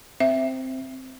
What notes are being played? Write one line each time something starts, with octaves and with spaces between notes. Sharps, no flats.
C4 E5